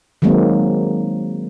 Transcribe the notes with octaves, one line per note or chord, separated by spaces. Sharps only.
D#3 F#3 G#3 A#3 C4